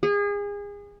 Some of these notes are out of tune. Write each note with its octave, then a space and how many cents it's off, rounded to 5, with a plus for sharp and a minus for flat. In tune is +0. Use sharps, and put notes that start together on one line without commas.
G#4 -30